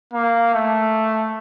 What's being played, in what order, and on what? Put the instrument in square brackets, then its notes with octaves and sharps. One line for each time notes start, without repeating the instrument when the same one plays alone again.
[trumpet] A#3
A3